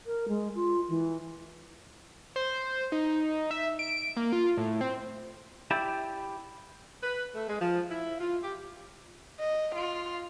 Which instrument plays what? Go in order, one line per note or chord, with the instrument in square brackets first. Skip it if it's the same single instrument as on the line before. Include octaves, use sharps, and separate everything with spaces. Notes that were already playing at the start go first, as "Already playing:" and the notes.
[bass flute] A#4
G#3
F4
E3
[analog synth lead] C5
D#4
E5
D7
A#3
F4
A2
C4
[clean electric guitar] E4 G4 D5 E5
[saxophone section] B4
A3
G#3
F3
E4
F4
G4
[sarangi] D#5
F4